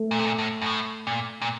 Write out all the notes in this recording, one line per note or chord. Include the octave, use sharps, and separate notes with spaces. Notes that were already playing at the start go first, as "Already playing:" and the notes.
Already playing: A3
A#2
C3
A#2
A2
F#2
A2
A#2
A#2